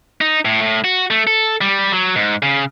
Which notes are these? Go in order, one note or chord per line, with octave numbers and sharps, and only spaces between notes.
D#4
A2
A2
F#4
A3
A4
G3
F#3
G#2
C#3